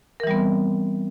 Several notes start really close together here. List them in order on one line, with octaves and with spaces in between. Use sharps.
A#4 E3 G3 B3 C4